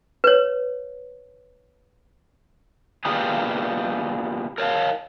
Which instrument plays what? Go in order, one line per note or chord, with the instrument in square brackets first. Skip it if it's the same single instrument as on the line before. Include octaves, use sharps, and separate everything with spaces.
[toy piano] B4 C#5
[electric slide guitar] A#3 B3 D4 F4 G4 G#4
A#4 C#5 D5 F5 A5